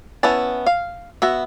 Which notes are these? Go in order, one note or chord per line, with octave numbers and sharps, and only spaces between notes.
B3 C#4 E4 B4 A5
F5
B3 F#4 E5